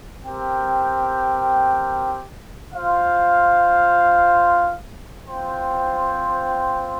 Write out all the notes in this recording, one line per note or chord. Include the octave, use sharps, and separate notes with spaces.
C4 G4 A#4 G5
F4 C5 F5
C4 F4 C5 G5